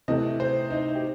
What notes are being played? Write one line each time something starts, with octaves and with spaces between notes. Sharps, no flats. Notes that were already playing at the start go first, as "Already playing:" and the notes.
C3 E3 A3 D#5
C5
D#4
G4